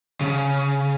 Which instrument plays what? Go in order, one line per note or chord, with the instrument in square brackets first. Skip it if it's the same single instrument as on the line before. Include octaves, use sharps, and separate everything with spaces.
[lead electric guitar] C#3